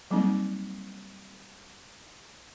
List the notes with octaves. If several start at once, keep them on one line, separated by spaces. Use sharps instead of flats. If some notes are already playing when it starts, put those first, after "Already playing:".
F#3 G3 A#3 C4 D#4